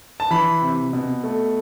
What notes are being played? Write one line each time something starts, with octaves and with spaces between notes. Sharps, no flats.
A5
E3 B5
C3
B2
A3